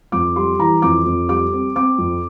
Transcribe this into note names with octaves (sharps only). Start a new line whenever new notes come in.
F2 D6
G3 C6
E3 A#5
F2 D6
F2
G3 D6
C4
C4 D6
F2